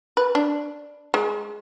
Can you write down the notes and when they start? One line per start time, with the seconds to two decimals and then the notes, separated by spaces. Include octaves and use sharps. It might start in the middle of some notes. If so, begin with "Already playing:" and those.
0.17 B4
0.35 D4
1.14 G#3